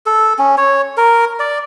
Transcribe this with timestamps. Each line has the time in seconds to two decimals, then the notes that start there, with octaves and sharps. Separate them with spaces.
0.06 A4
0.39 C#4
0.58 C#5
0.97 A#4
1.40 D5